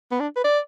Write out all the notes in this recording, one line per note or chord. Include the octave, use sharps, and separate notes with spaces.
B3
D4
B4
D5